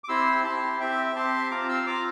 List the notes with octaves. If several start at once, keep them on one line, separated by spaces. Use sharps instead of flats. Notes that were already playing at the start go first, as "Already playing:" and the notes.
D6
C4 E4 G4 C6 E6
C4 E4 G4 A5 C6
C4 G4 E5 G5
C4 G4 A5 C6
C4 F4 A#5 D6
C6 E6
C4 F4 A#5 D6